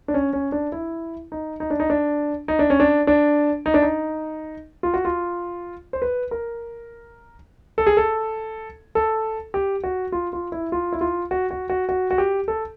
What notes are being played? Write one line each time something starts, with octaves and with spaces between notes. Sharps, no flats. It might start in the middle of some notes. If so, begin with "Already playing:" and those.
D4
C#4
C#4
D4
E4
D#4
D#4
D4
D#4
D4
D#4
D4
C#4
D4
D4
D#4
D4
D#4
F4
F#4
F4
C5
B4
A#4
A4
G#4
A4
A4
G4
F#4
F4
F4
E4
F4
E4
F4
F#4
F#4
F#4
F#4
F#4
G4
A4